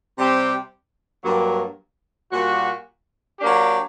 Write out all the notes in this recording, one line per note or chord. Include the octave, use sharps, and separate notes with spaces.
C3 G3 C4 G4
G2 F#3 A#3
A#2 G3 A#3 F#4
F#3 A#3 D4 G4